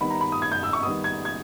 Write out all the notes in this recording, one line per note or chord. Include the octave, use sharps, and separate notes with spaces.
D#3 G3 B3 D#4 B5
A#5
B5
D#6
G#6
G6
E6
C#6
D#3 G3 B3 D#4 D#6
G#6
G#6